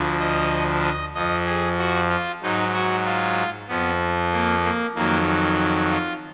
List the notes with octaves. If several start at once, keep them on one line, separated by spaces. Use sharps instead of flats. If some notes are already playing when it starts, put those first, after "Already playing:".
Already playing: D2 D3 F3
D#5
D#5
F2 F3 D#5
G#4
F#4
F4
G#2 F#3 D#4
F#4
F4
F2 F3 B3
A#3
A#3
F2 D#3 F#3 A#3
F4